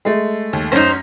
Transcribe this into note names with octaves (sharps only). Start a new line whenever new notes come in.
G#3 A3
D#2
F#2 C#4 D#4 C5 A#6